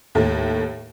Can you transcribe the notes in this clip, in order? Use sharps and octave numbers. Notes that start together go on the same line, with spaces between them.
D#2 A2